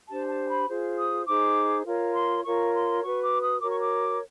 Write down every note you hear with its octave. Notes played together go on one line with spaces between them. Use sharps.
D4 G4 C5 A5
A5
B5
F4 G#4 C5
D#6
D#4 G#4 C5 D6
F4 A#4 C#5
C6
F4 A#4 C#5 C#6
C6
F#4 B4 C#6
D6
D#6
F#4 A#4 C#5 D6
C#6
D6